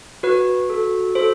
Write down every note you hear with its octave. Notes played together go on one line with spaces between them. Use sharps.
F#4 B4
A4
A4 C5